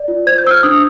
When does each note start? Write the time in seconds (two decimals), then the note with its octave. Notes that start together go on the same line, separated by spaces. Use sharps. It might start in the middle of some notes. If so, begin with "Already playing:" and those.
Already playing: D5
0.08 F4
0.26 C5 G#6
0.38 G6
0.44 C5 E6
0.51 F6
0.63 D4 D#6